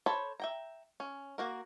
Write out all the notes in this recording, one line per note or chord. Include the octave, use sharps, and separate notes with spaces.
A4 C5 C#5 A5 B5
E5 G5 A#5
C#4
A#3 F#4 A#4